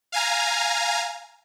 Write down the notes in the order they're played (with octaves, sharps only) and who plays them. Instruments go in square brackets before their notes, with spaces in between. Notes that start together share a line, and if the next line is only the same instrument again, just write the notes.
[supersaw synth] F5 G#5 A#5